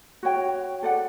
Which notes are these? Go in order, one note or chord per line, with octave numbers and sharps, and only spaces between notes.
F#4 C#5 G5
A4 D5 F#5